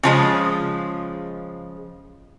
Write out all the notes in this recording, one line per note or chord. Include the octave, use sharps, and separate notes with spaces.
C#3 F3 G#3